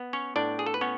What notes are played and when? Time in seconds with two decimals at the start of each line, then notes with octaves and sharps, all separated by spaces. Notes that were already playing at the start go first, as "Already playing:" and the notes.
Already playing: B3
0.13 C#4 C#5
0.36 A2 D4 D5
0.59 G#4
0.66 A4
0.74 B4
0.81 B3 C#4 C#5